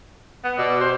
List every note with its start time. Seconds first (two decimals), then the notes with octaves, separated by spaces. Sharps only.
0.44 B3
0.58 B2 D5 D#5 E6
0.81 G4 C5